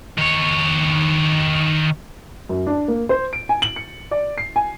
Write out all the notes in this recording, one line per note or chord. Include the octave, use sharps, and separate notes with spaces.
D#3 C#5
F#2
D4
A#3
C5
D7
G#5
F#7
C#7
D5
C7
G#5